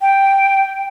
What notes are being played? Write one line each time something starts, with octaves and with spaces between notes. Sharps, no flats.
G5